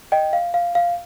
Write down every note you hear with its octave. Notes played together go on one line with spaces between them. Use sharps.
D#5 G5
F5
F5
F5